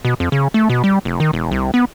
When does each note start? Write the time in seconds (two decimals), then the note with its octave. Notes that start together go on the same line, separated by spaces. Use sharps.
0.05 B2
0.20 F2
0.32 C#3
0.54 A3
0.69 B2
0.84 G3
1.05 F1
1.20 D#3
1.33 E1
1.51 C2
1.74 B3